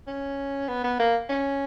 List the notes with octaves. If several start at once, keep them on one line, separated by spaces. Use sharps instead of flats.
C#4
B3
B3
A#3
C#4